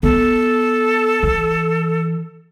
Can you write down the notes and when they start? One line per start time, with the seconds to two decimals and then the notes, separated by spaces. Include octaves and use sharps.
0.03 B3 A4
1.23 E3